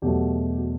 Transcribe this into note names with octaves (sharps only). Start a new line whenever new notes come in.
E2 B2 F#3 A3 G4
F#4